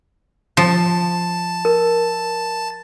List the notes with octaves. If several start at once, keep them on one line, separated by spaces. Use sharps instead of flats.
F3 A5
A#4